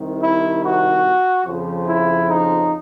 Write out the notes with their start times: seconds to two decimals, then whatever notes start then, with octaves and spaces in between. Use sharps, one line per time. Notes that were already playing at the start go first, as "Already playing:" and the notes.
Already playing: C2 C3 D#3
0.23 E4
0.64 F#4
1.46 F2 C#3 F3
1.86 E4
2.28 D#4